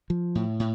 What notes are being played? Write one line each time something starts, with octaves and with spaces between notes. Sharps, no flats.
F3
A2
A2